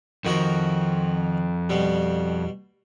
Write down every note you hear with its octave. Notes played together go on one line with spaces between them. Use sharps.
F2 D#3 F3 F#4 A#4
B2 G3